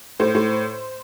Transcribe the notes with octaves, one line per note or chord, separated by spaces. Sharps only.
A2 C5
A2